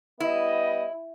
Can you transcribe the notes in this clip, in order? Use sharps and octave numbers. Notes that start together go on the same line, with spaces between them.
G3 B3 E4 D#5